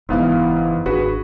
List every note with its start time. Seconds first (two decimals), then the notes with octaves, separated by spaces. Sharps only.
0.09 F#1 G#2 E3 B3 F5
0.86 G#1 D4 F#4 G#4 B4